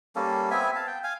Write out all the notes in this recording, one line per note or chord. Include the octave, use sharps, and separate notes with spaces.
G3 A#3 C#4 A4
B3 C4 E5 G#5
F5 A5
G5
F5 G#5